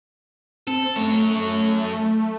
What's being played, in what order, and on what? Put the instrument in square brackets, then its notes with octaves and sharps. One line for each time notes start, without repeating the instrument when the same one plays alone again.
[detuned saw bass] C4 [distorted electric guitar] A4
[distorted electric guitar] F#2 C#5 [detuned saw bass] A3